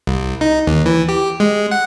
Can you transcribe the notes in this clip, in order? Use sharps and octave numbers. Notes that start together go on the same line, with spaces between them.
C2
D#4
D#2
E3
G4
G#3
F#5